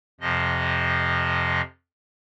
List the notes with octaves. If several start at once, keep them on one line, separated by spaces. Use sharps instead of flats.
F2 C3 F3 D#5